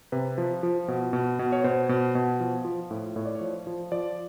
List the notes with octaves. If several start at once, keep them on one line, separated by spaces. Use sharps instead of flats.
C3 B4
F3
F3
B2
B2
B2
C#5
B2 C5
B2
B2
F3
F3
A2
A2 C#5
D5
C#5
F3
F3
F3 D5